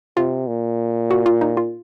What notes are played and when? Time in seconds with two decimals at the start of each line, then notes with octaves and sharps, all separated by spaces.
0.17 C3 F4
0.47 A#2
1.11 F#4
1.26 F4
1.41 D#4
1.57 F4